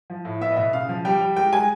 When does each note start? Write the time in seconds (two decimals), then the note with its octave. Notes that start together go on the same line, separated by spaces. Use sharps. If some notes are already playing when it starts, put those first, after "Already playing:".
0.10 F3
0.25 A2
0.41 B3 E5
0.52 D#5
0.57 B2 E5
0.73 C#3 F5
0.89 F3
1.05 G3 G5
1.21 G3
1.36 G#3 G5
1.53 G#3 G#5